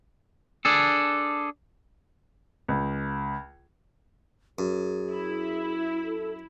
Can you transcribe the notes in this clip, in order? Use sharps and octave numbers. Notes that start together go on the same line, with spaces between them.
D4 G#4 A4
C#2
F#2 G#4
E4
A4